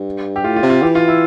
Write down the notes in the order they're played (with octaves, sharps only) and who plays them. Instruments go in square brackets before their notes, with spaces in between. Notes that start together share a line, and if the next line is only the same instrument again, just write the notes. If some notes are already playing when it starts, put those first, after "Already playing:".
Already playing: [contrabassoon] G2
[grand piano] G4
[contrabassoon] A2 [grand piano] F4
[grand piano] F4
[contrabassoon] C3
[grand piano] F4
[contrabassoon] E3 [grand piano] G4
[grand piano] F4
E4